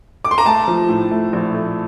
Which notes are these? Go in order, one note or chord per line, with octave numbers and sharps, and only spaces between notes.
D6
C6
A#5
A3 A5
F3
A2
A3
A#1
A3